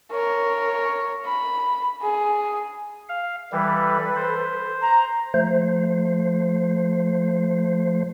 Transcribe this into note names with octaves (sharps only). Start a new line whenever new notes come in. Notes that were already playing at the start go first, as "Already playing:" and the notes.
A#4 C#5
B5
G#4
F5
E3 G3 A4 B4
C5
A#5
F3 A3 C5